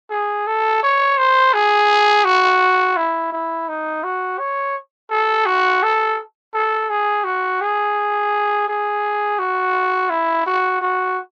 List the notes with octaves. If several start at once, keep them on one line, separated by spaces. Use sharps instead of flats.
G#4
A4
C#5
C5
G#4
F#4
E4
E4
D#4
F#4
C#5
A4
F#4
A4
A4
G#4
F#4
G#4
G#4
F#4
E4
F#4
F#4